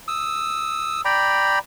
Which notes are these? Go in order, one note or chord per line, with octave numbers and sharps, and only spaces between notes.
D#6 E6
D5 G5 A#5 B5